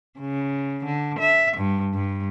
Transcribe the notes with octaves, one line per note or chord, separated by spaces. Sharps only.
C#3
D3
E5
G2
G2